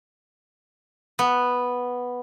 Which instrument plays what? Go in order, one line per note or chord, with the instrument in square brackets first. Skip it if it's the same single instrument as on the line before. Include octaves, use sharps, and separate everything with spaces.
[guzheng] B3